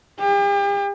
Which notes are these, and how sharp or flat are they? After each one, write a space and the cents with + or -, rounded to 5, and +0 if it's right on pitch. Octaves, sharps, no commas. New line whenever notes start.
G4 +40